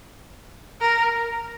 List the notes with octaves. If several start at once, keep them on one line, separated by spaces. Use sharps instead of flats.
A#4